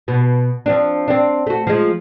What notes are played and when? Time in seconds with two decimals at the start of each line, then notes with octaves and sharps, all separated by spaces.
0.08 B2
0.66 F3 C4 D4
1.08 C4 D4
1.47 A3 F#4
1.67 F3 G#3